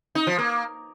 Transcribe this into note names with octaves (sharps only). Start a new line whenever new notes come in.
D#4
F3
A#3